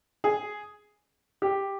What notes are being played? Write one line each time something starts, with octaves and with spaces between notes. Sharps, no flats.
G#4
G4